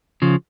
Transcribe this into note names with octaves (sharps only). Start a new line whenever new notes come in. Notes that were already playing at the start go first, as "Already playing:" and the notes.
C#3 F3